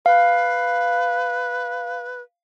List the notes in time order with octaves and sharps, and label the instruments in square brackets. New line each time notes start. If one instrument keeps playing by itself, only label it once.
[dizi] B4 [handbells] F5